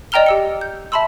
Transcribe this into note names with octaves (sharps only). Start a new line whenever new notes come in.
D5 D#5 G5 A#5 F6 G7
G4 E6 C#7
G6
E5 A5 B5 C6 E6